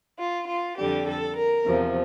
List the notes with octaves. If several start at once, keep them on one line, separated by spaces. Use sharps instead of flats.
F4
F4
F2 D3 G3 G4
A4
A#4
E2 C3 F3